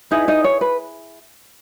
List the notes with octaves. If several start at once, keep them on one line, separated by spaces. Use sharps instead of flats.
D#4 E4 G#4 B4 D#5
D#4 D#5
C#5
B4